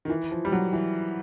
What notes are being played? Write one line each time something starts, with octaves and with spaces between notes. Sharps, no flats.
D#3
E3
F3
G3
F#3
E3